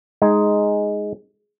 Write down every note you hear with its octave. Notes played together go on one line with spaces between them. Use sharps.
G#3 D#4 G#4